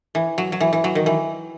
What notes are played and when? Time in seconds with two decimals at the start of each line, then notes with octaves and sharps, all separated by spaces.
0.15 E3
0.38 F#3
0.52 F#3
0.61 E3
0.73 E3
0.84 F#3
0.95 D#3
1.06 E3